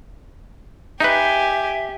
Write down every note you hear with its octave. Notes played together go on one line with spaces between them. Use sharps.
D#4 G4 B4 E5 G#5